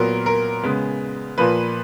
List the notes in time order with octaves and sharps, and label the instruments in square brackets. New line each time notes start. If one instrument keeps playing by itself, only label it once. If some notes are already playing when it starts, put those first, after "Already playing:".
Already playing: [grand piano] A#2 F#3 B3 A#4
A#4
C#3 G#3 B3
A#2 F3 A#3 B4